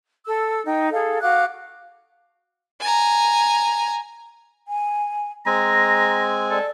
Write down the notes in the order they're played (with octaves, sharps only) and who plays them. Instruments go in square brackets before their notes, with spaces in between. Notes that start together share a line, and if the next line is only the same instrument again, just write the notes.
[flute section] A4 E6
D#4 G5
G#4 A4 F5
F#4 F5 D6 F#6
[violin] G#5 A#5
[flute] G#5
[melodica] G#3 C4 G#5 [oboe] A#5 [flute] A#6
[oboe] A4 [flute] D5